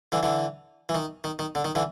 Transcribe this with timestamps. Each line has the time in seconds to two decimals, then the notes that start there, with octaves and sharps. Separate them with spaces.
0.12 D3 E3
0.23 D3 E3
0.89 E3
0.95 D#3
1.24 D#3
1.39 D#3
1.55 D3
1.65 D#3
1.75 D3 E3